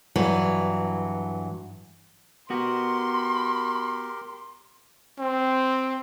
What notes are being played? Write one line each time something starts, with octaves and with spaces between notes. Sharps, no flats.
G2 E3 F#3
B3 F#4 G4 A#4 C6
C4